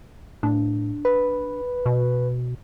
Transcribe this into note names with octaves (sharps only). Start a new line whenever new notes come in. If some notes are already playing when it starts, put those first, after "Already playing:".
A2 D4
B4
B2